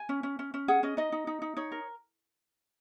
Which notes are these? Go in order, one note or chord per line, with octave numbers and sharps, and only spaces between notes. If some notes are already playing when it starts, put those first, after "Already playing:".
Already playing: G#5
C#4
C#4
C#4
C#4
G#4 F#5
C#4 D#5
D#4 D#5
D#4
D#4
D#4
D#4 C#5
A#4